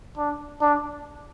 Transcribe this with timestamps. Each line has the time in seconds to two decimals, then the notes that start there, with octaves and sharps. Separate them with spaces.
0.18 D4
0.61 D4